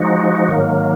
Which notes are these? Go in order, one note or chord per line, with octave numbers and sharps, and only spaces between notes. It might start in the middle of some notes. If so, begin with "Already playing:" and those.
Already playing: F3 G#3 D#4 F#4
G#2 D#3 F#3 A#3